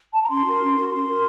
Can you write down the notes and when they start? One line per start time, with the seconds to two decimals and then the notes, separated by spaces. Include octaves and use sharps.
0.13 A5
0.22 A#5
0.30 C#4 C6
0.46 F#4 A#4
0.61 C#4
0.76 F#4 A#4
0.91 C#4 C6
1.06 F#4 A#4